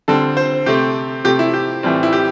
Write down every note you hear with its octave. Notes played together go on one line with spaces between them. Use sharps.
D3 G3 C4 A4
C5
C3 A3 C4 G4
C3 A3 C4 G4
E4
G4
A2 E3 G3 C4
E4
G4